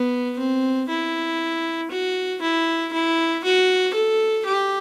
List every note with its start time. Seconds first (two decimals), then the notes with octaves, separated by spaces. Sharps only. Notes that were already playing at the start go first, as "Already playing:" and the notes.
Already playing: B3
0.39 C4
0.89 E4
1.91 F#4
2.42 E4
2.93 E4
3.44 F#4
3.94 A4
4.46 G4